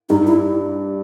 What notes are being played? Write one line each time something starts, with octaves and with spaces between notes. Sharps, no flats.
G2 D#4
E4